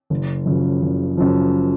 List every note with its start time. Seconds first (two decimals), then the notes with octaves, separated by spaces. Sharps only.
0.10 F#1
0.46 F#2 C#3 F3
0.82 F#1
1.17 F#2 C#3 F3